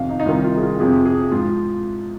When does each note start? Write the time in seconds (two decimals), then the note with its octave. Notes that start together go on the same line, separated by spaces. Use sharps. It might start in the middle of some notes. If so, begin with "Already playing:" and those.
Already playing: F2 C3 D#3 F5
0.09 D#4
0.20 D#4
0.26 C2 C3 D#3 F4
0.44 F4
0.57 G#4
0.62 F4
0.79 F2 C3 F3 G#4
1.06 G#4
1.31 G#2 F3 F4